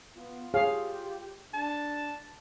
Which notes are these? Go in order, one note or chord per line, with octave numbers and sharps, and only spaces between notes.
B3 F4
G4 G#4 C#5 F5
D4 A5